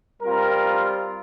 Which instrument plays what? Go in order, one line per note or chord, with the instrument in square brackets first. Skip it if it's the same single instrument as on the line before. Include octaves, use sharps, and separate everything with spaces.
[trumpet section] G3 C4 F4 A#4